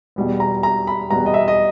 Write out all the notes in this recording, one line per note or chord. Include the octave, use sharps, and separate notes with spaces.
E2 B2 G3 B3
A#5
A#5
B5
E2 B2 G3 B3 A#5
D#5
E5
D#5